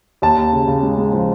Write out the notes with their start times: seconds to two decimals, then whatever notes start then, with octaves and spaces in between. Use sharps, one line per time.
0.22 D#2 A5
0.37 D#2
0.53 C#3
0.68 C#3
0.83 G#3
0.98 G#3
1.13 F3